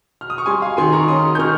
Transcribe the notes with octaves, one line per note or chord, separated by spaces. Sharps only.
F6
D#6
C#6
G3 G#5 C6
F5 G#5
D#3 G#5 C6
A#5 C#6
C#4 C6 D#6
G6
D#3 C#6 F6